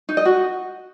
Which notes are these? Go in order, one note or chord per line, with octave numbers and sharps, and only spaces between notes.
D#4
D#5
F#4